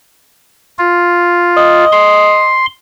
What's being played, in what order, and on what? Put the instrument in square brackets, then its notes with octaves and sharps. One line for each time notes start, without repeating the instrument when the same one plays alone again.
[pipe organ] F4
[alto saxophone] D#5
[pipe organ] C6